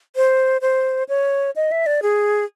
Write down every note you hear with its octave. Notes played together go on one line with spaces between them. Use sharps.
C5
C5
C#5
D#5
E5
D5
G#4